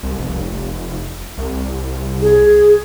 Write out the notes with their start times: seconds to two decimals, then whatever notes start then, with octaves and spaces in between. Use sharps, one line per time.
0.03 C2
0.18 F1
1.38 C2
2.22 G#4